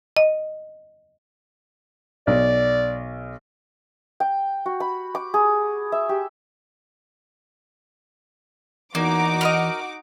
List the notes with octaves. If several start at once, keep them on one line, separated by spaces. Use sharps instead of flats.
D#5
B1 D5
G5
F#4
B5
D6
G#4
E5
G4
E2 A#3 D#4 F#4 D6
A#4 B4 D#5